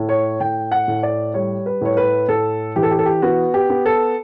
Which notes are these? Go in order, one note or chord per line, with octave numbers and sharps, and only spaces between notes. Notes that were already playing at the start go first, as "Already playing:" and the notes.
Already playing: A2
C#5
A2 G5
F#5
A2
D5
G3 C#5
B4
A2 C#5
B4
A2 A4
E3 G4
A4
G4
A4
G4
B3 F#4
G4
B3
A4